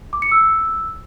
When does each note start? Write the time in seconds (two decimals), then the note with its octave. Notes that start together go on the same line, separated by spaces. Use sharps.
0.13 D6
0.22 C#7
0.31 E6